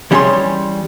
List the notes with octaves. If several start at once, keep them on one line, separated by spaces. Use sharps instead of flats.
E3 G3 C#4 G#4 C#5 C6